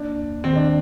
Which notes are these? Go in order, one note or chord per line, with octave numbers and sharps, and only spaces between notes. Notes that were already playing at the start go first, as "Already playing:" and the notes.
Already playing: A#3 D4
D#2
D#3 C4
D4